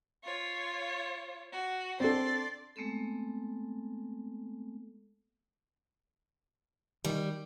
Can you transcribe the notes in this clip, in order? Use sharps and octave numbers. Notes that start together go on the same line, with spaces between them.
F4 C#5
F#4
C4 D4 A4 D5 C6
G#3 A3 B3 C4 A4
D#3 G3